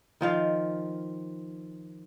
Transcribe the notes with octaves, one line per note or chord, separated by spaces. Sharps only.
D#3 F3 F5